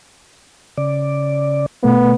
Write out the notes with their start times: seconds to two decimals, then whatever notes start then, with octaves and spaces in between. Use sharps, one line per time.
0.77 C#3 D5
1.83 B2 A3 B3 B4